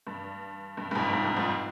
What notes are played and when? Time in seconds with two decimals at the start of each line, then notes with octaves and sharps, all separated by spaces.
0.07 G2
0.77 G2
0.91 G2
0.95 F2 G#2
1.13 F2 G#2
1.25 G2
1.37 F2 G#2